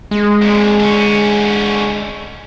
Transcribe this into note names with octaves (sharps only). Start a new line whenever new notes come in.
G#3
F2 A#2
D3 C#4